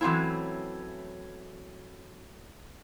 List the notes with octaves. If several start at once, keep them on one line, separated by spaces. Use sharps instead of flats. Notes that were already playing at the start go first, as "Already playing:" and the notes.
E3 F#3 A3 C4 C#4 E4